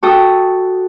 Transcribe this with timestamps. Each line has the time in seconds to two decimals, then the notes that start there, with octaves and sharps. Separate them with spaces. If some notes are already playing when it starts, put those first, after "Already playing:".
0.03 F#4 A4 G5 D#6 E6